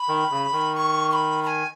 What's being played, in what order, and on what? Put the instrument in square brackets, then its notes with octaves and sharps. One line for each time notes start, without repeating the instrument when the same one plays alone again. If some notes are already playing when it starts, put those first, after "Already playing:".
Already playing: [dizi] B5
[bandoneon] D#3
C#3
D#3
[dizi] C#6
C#6
B5
B5
G#5